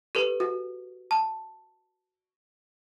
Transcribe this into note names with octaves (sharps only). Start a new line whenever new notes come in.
G4 A4 B4
F#4
A5